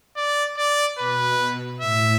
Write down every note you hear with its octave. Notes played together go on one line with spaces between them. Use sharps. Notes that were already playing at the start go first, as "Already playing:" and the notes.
D5
D5
B2 B4
A2 E5